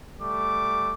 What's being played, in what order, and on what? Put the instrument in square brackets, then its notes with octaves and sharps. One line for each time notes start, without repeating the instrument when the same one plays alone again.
[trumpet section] G3 A3 D6